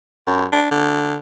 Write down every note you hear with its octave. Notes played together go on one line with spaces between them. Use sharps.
F#2
D4
D3